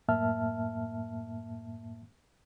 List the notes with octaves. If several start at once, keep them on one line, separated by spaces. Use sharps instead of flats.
F#2 A2 A#3 E5 A5 F6